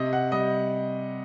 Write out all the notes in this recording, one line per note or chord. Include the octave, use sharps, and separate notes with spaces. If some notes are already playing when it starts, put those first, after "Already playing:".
Already playing: C3 D#5
F#5
G3 D#5